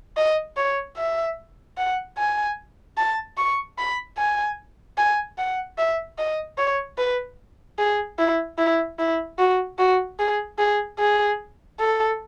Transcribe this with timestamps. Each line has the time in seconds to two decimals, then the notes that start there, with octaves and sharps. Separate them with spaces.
0.17 D#5
0.57 C#5
0.97 E5
1.78 F#5
2.18 G#5
2.97 A5
3.38 C#6
3.78 B5
4.18 G#5
4.98 G#5
5.38 F#5
5.78 E5
6.18 D#5
6.58 C#5
6.98 B4
7.78 G#4
8.19 E4
8.58 E4
8.99 E4
9.39 F#4
9.79 F#4
10.19 G#4
10.59 G#4
10.99 G#4
11.80 A4